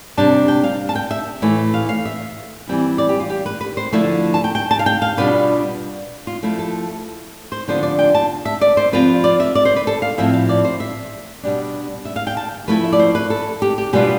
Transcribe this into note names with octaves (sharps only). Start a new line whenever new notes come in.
C3 G3 D4 A5
G5
F5
A5
G5
E5
A2 E3 A3
F5
F5
E5
E3 G3 C4 E4
D5
G4
F4
G4
B4
B4
C5
D3 F3 A3 E4 E5
A5
G5
G5
A5
F5
G5
F5
B2 G3 D4 F4 B4
F4
F3 A3 E4
A4
C5
D3 F3 B3 D4 F4 C5
D5
G5
A5
E5
D5
C5
F3 C4 F4 B4
D5
E5
D5
C5
B4
A4
F5
A2 F3 C4 E4 E5
F5
D5
C5
E5
B2 G3 D4
E5
F5
G5
A5
F3 A3 E4 B4
E5
D5
C5
B4
A4
G4
G4
B2 G3 B3 D4 F4 G4